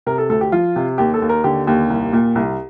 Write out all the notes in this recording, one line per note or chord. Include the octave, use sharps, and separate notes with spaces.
C3 A#4
A4
D2 A4
G4
F3 F4
C3
D#2 G4
A4
D#2
A#4
D3 G4
D#2 G4
C2
A#2
C2